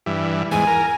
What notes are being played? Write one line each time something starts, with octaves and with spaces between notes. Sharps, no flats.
G2 E3
E2 G#2 G#5
A#4